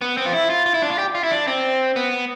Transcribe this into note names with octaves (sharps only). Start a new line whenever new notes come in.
B3
C4
F4
E4
F4
F4
E4
D4
F4
G4
F4
E4
D4
C4
B3